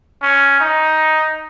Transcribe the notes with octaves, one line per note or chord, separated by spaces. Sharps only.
C#4
D#4